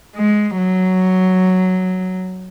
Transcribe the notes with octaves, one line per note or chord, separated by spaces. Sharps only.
G#3
F#3